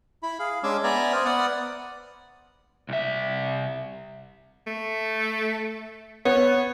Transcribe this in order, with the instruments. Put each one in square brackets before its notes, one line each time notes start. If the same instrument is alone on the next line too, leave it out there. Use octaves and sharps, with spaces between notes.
[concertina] E4 B5
G#4 F5
G#3 C#4 D4 G#5 D6 E6
B3 D5 E5 G#5 A#5
C5 D#6 F6
B3 D5 F#5 D#6
[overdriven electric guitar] C2 E5
[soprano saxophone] A3
[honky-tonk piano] B3 [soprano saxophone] C#5